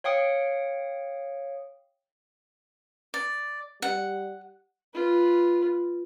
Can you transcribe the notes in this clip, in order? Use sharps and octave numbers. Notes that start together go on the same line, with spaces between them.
C#5 F5 G5 D#6 C#7
D5
G3 F#5
F4 B4